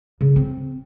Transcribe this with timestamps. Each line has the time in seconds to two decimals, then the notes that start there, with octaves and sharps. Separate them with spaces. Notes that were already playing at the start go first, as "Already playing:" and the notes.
0.21 C#3
0.36 C4